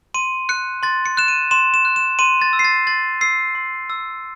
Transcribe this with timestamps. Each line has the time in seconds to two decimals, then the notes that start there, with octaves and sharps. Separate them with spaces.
0.14 C6 D#7
0.49 F#6 C#7
0.83 C6 A6
1.06 C#7
1.17 F#6 E7
1.28 D#7
1.51 C6 E7
1.74 E7
1.85 F#6
1.96 E7
2.19 C6 D#7
2.42 A6
2.53 E6
2.59 C7
2.64 A6
2.87 C6 A6
3.21 E6 C7
3.55 C6
3.90 E6